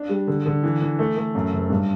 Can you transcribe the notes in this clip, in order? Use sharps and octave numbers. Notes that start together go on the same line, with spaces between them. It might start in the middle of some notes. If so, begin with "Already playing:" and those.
Already playing: D4
G3
D3
D3
E3
E3
A3
A3
F#2
F#1
G2